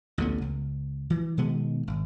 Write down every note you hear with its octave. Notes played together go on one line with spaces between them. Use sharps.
A1 D2 D3 B3
C#2
E3
B2 D#3 G#3 B3
G#1